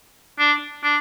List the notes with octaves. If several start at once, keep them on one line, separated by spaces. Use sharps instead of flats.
D4
D4